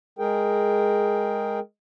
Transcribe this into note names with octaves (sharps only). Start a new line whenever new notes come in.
G#3 G#4 A#4 G5